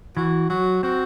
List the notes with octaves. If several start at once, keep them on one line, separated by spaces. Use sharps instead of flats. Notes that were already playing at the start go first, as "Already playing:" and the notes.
E3 F#4
F#3 F#4
C4 F#4